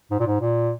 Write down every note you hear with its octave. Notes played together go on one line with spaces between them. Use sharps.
G#2
A#2
G#2
A#2